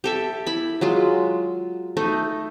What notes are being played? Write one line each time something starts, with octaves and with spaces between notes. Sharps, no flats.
G4 A4 E5
E4 B5
F#3 G#3 F4
A3 D#4